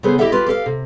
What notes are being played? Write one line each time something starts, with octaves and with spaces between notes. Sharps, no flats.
C#3 B3 G#4 A4 C5
E4 G4 A4 D#5 E5 F#5
F4 G4 B4
G4 A4 E5 F5
C3